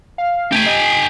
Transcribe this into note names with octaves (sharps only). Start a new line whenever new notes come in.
F5
A3 G4 G#5
D#5